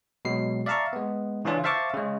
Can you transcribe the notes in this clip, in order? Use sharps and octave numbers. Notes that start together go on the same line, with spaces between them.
B2 F#3 G#3 C7
D5 E5 F5 A5 A#5 C#6
G#3 B3
C#3 E3 C#4 D4 F4
C5 E5 F5 A5 C#6 D6
C#3 G#3